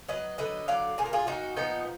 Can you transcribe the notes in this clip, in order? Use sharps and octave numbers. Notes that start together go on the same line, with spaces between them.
F#3 B4 D#5
D3 B4 D#5
F#3 D5 F5
A#2 G#4
A#4
F4 G#4
A#2 D#4 F#4
F3 B3 D#4